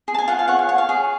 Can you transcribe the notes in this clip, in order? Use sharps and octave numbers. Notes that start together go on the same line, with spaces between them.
G#4
A5
G#5
F4 F#5
F5
C#5 F#5
G#5
C#5 F#5
F5
G#4